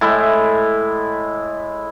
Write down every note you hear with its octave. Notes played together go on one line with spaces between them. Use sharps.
A2 G#3 E4